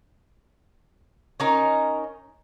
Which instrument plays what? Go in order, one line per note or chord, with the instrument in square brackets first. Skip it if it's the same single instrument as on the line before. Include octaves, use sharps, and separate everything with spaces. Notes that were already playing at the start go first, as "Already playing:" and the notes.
[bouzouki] C#4 D#4 A#4